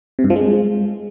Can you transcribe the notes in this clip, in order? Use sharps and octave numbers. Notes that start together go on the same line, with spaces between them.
C3
G2
F3
G#3